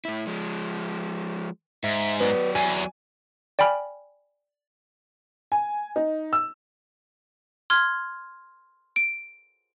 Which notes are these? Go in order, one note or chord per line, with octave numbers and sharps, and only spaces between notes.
A2 E4
F3 G#3
G#2 E5
F#3 B3 D5
E2 G#5
D5 G5 G#5 B5 F6
G#5
D#4
E6
C6 F6 G#6
D7